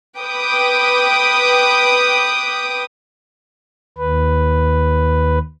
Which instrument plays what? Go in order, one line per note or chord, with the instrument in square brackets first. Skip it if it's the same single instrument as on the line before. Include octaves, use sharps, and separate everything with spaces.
[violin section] B4 G5 D6 D#6
[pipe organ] D#2 B4